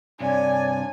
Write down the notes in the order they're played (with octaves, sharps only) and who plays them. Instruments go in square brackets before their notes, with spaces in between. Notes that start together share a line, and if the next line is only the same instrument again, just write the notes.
[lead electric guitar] G2 C3 [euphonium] D4 [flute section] C#5 D5 [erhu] G#5